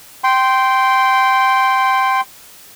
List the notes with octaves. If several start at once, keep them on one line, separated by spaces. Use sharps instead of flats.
G5 C6